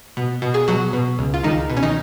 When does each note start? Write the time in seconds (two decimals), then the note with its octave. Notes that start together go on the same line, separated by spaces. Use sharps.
0.17 B2
0.42 B2
0.54 G#4
0.68 B2 F#3 F#4
0.93 B2
1.19 C#2
1.34 F4
1.43 C#2 D#3 D#4
1.70 B2
1.77 C#4
1.83 D#3 D#4